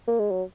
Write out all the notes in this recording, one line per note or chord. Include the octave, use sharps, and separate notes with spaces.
A#3
G#3
F#3